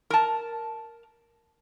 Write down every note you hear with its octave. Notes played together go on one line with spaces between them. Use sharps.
A#4 A5